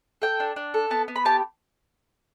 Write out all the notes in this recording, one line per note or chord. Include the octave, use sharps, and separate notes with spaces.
A4 G5
D4
D4
A4
B3 A5
B3
B5
G4 A5